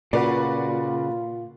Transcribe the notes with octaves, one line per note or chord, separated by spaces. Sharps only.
A#2 C#3 F4 F#4 B4 D5